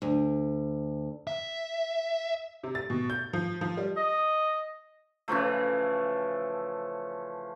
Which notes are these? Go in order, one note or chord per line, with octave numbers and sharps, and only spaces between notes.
D2
E5
C3
A6
B2
G6
F3
F3
G3
D#5
C#3 E3 F3 A3